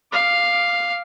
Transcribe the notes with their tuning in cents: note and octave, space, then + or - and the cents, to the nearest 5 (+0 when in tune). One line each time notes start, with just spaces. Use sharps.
F5 +0 D6 +5